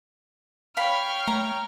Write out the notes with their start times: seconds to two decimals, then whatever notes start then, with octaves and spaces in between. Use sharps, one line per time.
0.77 C#5 F5 G5 B5 F6
1.27 A3 A#5